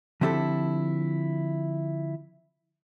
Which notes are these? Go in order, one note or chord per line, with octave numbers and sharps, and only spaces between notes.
D3 F3 C4 E4 G4 A4